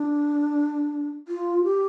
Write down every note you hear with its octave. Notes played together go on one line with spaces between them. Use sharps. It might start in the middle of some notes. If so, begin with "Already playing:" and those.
Already playing: D4
F4
G4